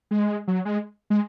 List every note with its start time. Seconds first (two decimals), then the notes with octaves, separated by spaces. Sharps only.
0.11 G#3
0.48 F#3
0.65 G#3
1.10 G#3